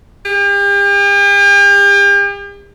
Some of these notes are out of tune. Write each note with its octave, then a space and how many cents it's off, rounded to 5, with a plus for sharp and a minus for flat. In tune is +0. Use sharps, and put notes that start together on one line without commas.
G4 +40